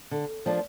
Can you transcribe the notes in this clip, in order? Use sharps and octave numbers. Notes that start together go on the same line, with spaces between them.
D3
F3 A#3 D4